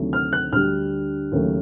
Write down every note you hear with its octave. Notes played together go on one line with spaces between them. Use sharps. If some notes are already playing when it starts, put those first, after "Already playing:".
Already playing: D2 C3 D#3 F#3 A3
F6
F#6
D2 D3 G3 F6
D#2 C#3 F#3 A3